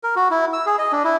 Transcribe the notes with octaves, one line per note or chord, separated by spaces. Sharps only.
A#4
F#4
E4
E6
G#4
D#5
D4
E4